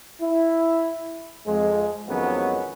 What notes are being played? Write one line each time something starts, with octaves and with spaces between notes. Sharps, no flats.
E4
F2 G#3
F2 D#3 F#3 G#3 B3 C#4